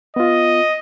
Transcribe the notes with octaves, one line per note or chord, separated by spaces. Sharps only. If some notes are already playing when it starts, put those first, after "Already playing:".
B3 F4 D#5